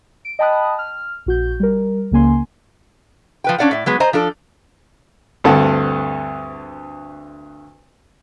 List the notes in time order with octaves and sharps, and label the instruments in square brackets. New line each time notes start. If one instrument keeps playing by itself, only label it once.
[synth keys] D7
D#5 G5 A5 B5 D#6 F#6
F6
A#1 F#4 G6
G3 A#4
C#2 C#3 A#3 G#5 C6
[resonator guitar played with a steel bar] F3 B4 G5
C#4 D4 D5 F5 F#5
A2 D5
F#3 G#3 B3
C5 D#5 G#5 A#5
F3 D4 A4 D5
[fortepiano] D2 G2 C4 A4 F#5